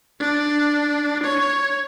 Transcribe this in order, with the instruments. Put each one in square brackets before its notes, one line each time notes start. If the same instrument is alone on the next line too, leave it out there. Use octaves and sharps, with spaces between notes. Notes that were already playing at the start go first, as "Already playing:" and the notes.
[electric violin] D4
C#5